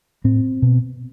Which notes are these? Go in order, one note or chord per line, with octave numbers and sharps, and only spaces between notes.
A2 C4
B2